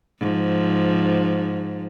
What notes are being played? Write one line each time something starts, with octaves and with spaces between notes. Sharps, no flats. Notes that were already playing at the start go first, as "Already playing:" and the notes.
G#2 F3